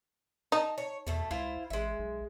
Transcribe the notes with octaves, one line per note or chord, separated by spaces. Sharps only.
D#4 D#5 A5
C#5
E2 B2 A3 A4
C#2 E4 F4 C5
A1 G#3 E5
B1